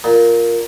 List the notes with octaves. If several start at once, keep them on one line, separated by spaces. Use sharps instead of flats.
A#2